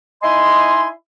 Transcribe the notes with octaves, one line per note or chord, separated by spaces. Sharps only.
D#4 E4 D#5 G#5 C6